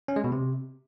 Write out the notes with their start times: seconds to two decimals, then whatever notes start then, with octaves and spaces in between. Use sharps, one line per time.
0.08 C#4
0.16 G#3
0.24 B2
0.32 C3